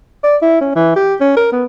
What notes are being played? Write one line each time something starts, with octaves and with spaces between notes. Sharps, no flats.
D5
E4
C#4
E3
G4
C#4
A#4
B3